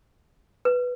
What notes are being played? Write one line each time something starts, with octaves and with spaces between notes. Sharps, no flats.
B4